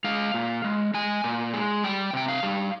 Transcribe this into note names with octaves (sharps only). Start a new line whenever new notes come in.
G#3 F5
A#2
G#3
G#3 G#5
A#2
G#3
G3 G5
C3 G5
F5
G3